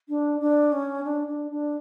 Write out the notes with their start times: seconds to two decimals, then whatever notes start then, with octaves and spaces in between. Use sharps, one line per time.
0.09 D4
0.41 D4
0.72 C#4
1.04 D4
1.27 D4
1.51 D4